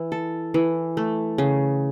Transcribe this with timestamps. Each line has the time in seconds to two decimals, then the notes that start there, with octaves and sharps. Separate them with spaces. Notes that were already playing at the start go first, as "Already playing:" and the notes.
Already playing: E3
0.12 A4
0.54 E3
0.97 A3
1.38 C#3